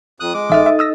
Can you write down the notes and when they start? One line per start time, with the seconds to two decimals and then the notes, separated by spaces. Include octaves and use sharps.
0.20 F2 D#6 F#6
0.34 G#3 D6
0.50 A1 D#4 A4 D#5 E5 F6
0.66 E5
0.79 D#6 E6 A#6